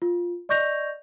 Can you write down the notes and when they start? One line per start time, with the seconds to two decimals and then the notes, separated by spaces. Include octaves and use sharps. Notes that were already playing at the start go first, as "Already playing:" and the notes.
0.02 F4
0.49 D5 D#5 C#6 G6 A#6 F7